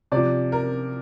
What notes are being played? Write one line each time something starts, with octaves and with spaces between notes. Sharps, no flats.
C3 F3 D5
A#4